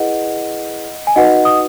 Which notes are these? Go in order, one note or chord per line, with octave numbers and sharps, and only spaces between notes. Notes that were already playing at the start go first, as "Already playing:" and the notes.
Already playing: E4 G#4 B4 D#5 F#5
G#5
D#4 F#4 B4 D#5 F#5
D#6